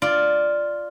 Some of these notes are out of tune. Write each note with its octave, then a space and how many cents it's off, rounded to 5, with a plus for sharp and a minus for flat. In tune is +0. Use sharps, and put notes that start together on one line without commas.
F4 +0 D5 +5